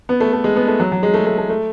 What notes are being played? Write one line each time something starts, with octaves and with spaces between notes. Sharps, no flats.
B3
A3
A3
G#3
B3
A3
F#3
F#3
G#3
A3
A3
A3
A3